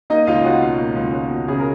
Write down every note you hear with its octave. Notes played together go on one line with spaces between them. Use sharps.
A#3 D#4 D#5
C#2 F4 F5
C#2 F#4 F#5
B2 F4 F5
A#3
C#2
C#2
B2
C#3 G#4
A#4